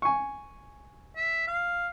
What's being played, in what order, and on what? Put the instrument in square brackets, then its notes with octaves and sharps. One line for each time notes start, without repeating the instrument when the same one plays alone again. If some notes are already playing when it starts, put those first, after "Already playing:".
[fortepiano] G#5 C#6
[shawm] E5
F5